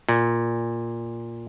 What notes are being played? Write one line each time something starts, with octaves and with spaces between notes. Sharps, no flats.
A#2